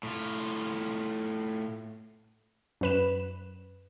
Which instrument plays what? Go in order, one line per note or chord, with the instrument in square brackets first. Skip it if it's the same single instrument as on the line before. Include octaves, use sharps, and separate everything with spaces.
[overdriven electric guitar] A2 F4
[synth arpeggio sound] F#2 B4 E7